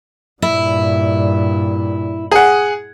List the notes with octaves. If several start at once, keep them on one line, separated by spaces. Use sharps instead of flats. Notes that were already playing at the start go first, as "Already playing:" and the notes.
G2 A#2 E4
G#4 F#5